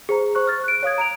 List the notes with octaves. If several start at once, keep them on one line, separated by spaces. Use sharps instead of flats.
G#4 C5 A#5
C5 C#6 F#6
F6 A6
F#6 D7
C#5 F5 D#6 G#6
A#5 D7 F7